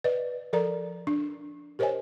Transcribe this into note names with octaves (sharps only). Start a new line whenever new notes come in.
B4 D5 D#5
F3 A4 A#4 D5 A#5
D4
G4 A#4 C5 C#5 D#5 G#5